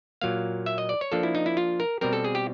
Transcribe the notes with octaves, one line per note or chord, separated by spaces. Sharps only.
A#2 F#3 A#3 F5
E5
D#5
D5
C#5
F3 A#3 D4 A4
E4
D#4
E4
F4
A#4
B2 G3 C4 A#4
A4
G#4
G4